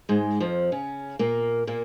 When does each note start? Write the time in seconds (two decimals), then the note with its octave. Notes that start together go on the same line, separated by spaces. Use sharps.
0.09 G#2 G#3
0.40 F2 F3
0.72 C#3 C#4
1.19 A#2 A#3
1.67 A#2 A#3